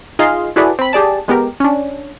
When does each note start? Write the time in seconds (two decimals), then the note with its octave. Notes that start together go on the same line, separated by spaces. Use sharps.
0.19 D#4 F4 G#4 D#5 F5 C6
0.56 E4 F#4 G#4 A4 B4 D5
0.79 C4 B5
0.93 G4 G#4 D5 A5
1.28 G#3 B3 G4 A#4
1.60 C#4 D4